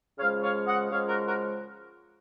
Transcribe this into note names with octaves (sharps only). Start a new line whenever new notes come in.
C#3 F3 G#3 C#5 F5
C#5 F5
D#5 F#5
C#3 F3 G#3 C#5 F5
F#4 A#4
F#4 A#4